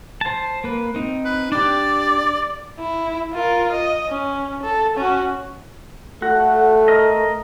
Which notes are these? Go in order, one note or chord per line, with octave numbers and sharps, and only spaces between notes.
C5 A5
A#3 B4
C4 D#4
B4
D4 G4 D5
E4
F4 A#4
D#5
C#4
A4
C#4 F#4
A3 F#4 A4
A#4 D#5